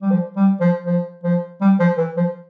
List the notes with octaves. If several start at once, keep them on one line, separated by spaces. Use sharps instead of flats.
G3
F3
G3
F3
F3
F3
G3
F3
E3
F3